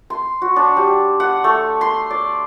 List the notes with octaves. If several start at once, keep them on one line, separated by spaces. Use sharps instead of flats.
C6
F#4
D4
G3
F#5
A3
C6
D5